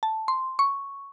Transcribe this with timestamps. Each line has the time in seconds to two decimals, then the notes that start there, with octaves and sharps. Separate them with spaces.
0.03 A5
0.28 C6
0.59 C#6